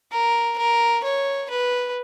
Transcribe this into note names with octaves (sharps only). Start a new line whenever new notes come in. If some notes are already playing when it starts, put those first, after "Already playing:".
A#4
A#4
C#5
B4